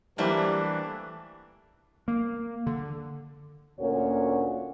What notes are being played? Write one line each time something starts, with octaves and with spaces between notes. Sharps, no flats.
E3 F#3 G3 A3 A#3 D4 E4 C5
A#3
D3
D2 A#2 A#3 C#4 F#4 C#5